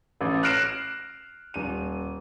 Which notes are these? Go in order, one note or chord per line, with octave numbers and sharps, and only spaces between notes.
A1
F6 F#6 A#6 C7 D7 E7
D#1 D#7